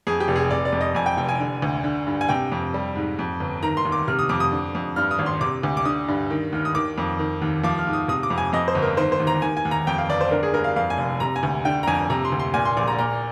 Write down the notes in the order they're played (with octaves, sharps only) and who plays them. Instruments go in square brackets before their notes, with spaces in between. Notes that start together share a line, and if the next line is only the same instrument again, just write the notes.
[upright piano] F2 G#4
G4
F1
G#4
C3 D5
D5
F2
D#5
F2 G#5
G5
F1 G5
G#5
D3
D2
D3
G2
G#5
C3 G5
F2
G3
G#2
F2
G1
D#3 A#5
C6
D#2
D6
C3 F6
D#6
F2 D6
D#6
D3
F2
G2 F6
D#6
G#1
C6
C3 D6
D2
D6
D3 D#6
G2
D#3
D#2 F6
D#6
D#3 D6
F2
D#3
D#2
F3 D6
F6
G#2
D#6
C3 D#6
D6
F2
G#5
F2 D#5
C5
G1
A#4
D#3 C5
C5
D#2
A#5
D#3 G#5
G#5
D#2
A#5
F2 G5
F5
G1 D5
C5
D3 A#4
G#4
G2 A#4
F5
F2 F5
G#5
F1
C3 A#5
G#5
D2
D3 G5
A#5
F2 G#5
C3 A#5
C6
D2
C6
A#2 G#5
C6
A#1 D6
A#5
A#2 A#5